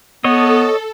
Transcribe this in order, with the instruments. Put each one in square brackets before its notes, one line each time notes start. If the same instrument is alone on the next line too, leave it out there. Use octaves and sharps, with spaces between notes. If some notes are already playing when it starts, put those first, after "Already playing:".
[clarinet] B3 [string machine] A4 [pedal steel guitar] C#5 D#5